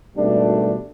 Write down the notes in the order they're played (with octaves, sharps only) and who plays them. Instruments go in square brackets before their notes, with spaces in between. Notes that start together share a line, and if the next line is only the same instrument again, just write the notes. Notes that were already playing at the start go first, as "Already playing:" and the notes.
[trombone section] G#1 B2 G3 A3 D4